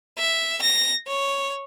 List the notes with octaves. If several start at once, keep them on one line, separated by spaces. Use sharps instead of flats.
E5
A#6
C#5